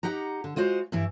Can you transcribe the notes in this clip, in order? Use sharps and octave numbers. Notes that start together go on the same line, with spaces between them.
D#4 G4 F#5 A#5
D3
G#3 F4 F#4 C5
G2 E3 E4